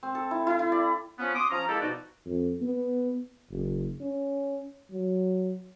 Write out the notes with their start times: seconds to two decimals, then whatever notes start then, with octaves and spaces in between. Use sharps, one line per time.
0.03 C4
0.15 A4
0.31 E4
0.47 E4
0.59 E4
0.72 D5
1.19 F3 B3 C#4
1.35 C6 D6 D#6
1.50 F3 C#4 A#5
1.68 G#3 A#3 E4 G4 A4
1.81 B2 F3 D#4 F#4 D5
2.26 F2
2.61 B3
3.51 F#1
4.01 C#4
4.91 F#3